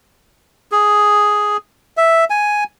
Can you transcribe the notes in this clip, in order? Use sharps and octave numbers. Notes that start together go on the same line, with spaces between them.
G#4
E5
G#5